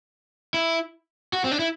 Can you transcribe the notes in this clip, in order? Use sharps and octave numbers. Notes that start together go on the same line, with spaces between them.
E4
F#4
C4
D4
E4